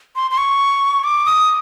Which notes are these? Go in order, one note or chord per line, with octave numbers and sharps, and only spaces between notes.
C6
C6
C#6
D6
D#6